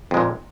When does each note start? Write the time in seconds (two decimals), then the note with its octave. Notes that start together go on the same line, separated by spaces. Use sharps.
0.11 F2
0.14 G#3
0.17 A#2